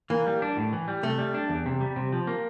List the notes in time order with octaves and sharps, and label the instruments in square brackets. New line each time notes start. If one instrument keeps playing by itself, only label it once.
[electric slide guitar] E3 [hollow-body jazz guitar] A#3
[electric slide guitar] G3
D4
A2
E3
G3
[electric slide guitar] C3 [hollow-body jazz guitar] A3
[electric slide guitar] G3
D4
E2
C3
G3
C3
F3
A#3